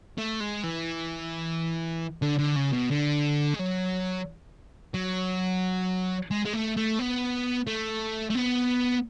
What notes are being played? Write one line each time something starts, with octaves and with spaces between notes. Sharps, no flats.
A3
G#3
E3
D3
D3
C#3
B2
D3
G#3
F#3
F#3
G#3
G#3
A3
A3
B3
A3
A3
B3